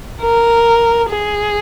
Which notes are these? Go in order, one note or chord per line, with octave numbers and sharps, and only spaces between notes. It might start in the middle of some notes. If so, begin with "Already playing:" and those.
A#4
G#4